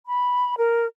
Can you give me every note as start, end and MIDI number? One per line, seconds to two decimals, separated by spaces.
0.07 0.54 83
0.58 0.86 70